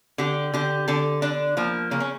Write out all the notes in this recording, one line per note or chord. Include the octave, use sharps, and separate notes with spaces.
D3 G4
D3 G4
D3 A4
D3 D4
F3 A#3
C#3 A#3
C#4